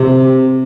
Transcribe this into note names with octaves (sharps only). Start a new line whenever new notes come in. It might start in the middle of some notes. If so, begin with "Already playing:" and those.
Already playing: C3